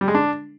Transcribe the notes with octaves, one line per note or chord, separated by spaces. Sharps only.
G3
G#3
D4